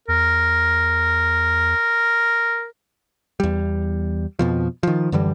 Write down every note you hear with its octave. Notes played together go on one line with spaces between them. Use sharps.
E2 A#4
E2 G3
F2 B2 F3
D#3 F3
F#2 D3 E3 G3